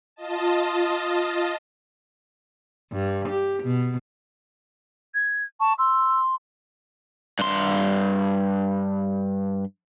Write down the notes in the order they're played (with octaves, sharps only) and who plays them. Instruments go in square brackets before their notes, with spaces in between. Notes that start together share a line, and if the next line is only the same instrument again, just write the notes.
[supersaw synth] F4 D#5 A5
[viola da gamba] G2
G4
B2
[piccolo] G#6
[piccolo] A5 [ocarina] C#6
[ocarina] C6 [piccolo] E6
[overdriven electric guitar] G2 C6